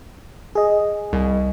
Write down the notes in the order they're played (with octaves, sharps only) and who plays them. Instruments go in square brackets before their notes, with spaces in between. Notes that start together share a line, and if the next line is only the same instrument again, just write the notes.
[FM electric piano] G#4 D#5
[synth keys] C2